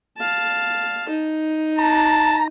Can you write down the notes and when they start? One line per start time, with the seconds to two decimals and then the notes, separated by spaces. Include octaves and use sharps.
0.18 F5 A5
1.09 D#4
1.79 A5 A#5